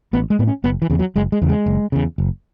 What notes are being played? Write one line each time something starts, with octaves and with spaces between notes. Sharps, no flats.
A1 B3
G#3
A2 B3
C#4
F#1 B3
E3
E2 C#3
F#3
F#1 G#3
G#3
E2 C#3
G#3
F#1
E2 C#3
F#1